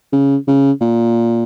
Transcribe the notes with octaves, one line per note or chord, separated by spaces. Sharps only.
C#3
C#3
A#2